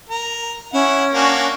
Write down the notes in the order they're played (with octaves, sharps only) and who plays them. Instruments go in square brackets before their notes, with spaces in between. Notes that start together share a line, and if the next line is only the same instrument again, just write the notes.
[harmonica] A#4
[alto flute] C#4 [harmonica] E4 F#5
[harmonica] A#3 D4 F#4